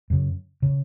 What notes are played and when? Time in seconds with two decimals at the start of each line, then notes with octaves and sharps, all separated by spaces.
0.10 F#2 C#3
0.62 C#3